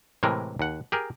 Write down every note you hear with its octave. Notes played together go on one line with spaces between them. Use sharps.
A2 C3 E3 G#3 A#4
D#2 F#5
G4 G#4 A#4